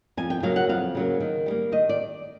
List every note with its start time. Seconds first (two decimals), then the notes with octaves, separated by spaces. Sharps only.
0.17 F2 G#5
0.30 G5
0.43 C#3 F#3 A#3 F5
0.56 F#5
0.69 F2 F5
0.95 C#3 F#3 A#3
1.20 D#3
1.46 G3 A#3
1.72 D#3 D#5
1.89 D5